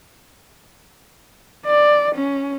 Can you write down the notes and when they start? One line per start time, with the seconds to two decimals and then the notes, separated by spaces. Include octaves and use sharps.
1.66 D5
2.15 C#4